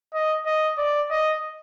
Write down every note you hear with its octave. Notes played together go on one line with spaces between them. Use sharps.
D#5
D#5
D5
D#5